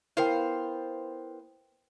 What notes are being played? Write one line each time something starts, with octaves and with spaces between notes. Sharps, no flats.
B3 E4 A#4 C5 F5 G5